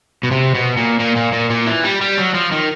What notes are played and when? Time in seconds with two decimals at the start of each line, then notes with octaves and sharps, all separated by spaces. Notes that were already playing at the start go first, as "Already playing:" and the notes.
0.23 B2
0.31 C3
0.55 B2
0.77 A#2
1.00 A#2
1.16 A#2
1.32 A#2
1.50 A#2
1.66 E3
1.83 G3
2.01 G3
2.18 F#3
2.34 F3
2.52 D#3